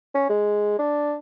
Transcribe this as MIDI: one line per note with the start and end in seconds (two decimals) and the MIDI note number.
0.15 0.24 61
0.29 0.79 56
0.79 1.15 62